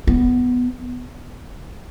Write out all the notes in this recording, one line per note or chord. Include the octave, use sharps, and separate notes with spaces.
B3